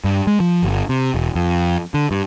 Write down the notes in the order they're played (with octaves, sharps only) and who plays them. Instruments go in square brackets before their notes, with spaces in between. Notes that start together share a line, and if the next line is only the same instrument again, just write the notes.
[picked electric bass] G2
G#3
F3
G1
C3
E1
F2
D3
G2